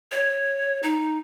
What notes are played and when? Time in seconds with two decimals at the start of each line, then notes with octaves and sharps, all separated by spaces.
0.12 C#5
0.83 D#4